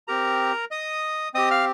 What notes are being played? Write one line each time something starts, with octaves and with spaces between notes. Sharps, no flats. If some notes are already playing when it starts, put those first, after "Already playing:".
C4 G4 A#4 A#5
D#5 D#6
C4 G4 D#5 D#6
F5 F6